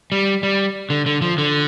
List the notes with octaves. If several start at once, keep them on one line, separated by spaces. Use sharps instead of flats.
G3
G3
D3
D3
F3
D3